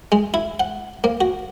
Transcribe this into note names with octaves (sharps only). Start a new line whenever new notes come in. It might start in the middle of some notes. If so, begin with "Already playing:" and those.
G#3
E4
F#5
A#3
F#4